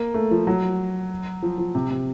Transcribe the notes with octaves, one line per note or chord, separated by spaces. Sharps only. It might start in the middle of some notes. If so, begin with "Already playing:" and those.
Already playing: A#3
A3
F3
F#3
F3
F3
C3
C3